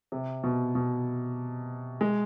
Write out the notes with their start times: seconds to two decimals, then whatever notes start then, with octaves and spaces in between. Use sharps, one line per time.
0.12 C3
0.43 B2
0.75 B2
2.01 G#3